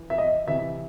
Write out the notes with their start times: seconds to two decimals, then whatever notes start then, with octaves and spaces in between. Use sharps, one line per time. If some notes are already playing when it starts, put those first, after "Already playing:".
Already playing: E3
0.10 E5
0.18 D#5
0.47 C3 E3 E5